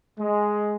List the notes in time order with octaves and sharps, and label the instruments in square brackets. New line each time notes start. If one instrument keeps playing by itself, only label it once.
[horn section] G#3